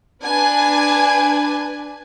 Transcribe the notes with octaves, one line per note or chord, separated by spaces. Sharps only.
D4 B4 G#5